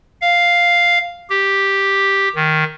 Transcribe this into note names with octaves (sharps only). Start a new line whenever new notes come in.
F5
G4
D#3